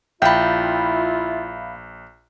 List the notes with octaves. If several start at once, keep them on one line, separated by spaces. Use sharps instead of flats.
A#1 E4 F4 E5 F5 G5 A5 B5